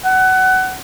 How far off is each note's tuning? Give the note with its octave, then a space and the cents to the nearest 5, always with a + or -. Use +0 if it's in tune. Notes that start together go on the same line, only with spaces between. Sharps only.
F#5 +20